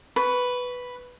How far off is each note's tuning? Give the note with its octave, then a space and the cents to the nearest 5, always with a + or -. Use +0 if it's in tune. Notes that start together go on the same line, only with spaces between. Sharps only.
B4 +0 C#6 +15